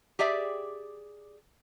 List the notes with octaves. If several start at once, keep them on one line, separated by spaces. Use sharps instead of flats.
G4 G#4 D5 E5